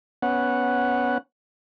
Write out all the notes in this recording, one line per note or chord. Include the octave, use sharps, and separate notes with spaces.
B3 C#4 F#5